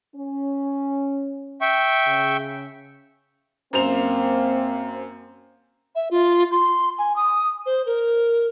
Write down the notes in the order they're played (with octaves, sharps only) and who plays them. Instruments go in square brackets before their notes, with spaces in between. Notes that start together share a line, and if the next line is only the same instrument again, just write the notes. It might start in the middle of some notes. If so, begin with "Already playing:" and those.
[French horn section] C#4
[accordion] E5 G5 C#6
[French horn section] C#3
[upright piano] F#2 C5 F7 [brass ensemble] A#3 C4
[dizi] E5
F4
C6
G#5
D#6
C5
A#4